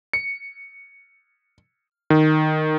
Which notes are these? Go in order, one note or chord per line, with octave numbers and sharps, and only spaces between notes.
C#7
D#3